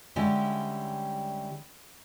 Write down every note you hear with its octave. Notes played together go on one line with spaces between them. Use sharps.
D3 G3 G#3 C#4 E4 G4